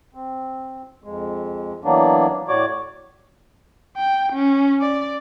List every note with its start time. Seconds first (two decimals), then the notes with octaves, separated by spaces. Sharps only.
0.14 C4
1.04 F2 G#3
1.84 E3 F#3 A#3 B3 D4
2.48 A2 F#4 C#5 D5 D6
3.97 G5
4.33 C#4
4.82 D5